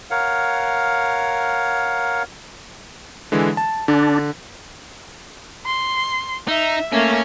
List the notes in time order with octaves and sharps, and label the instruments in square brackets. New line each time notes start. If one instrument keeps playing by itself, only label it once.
[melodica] A#4 C#5 F5 F#5
[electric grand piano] D3 E3 G#3
A5
[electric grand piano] D3 [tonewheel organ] D4
[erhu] C6
[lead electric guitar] D#4 [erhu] E5
[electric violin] A3 A#3 [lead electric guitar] C#4 [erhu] E5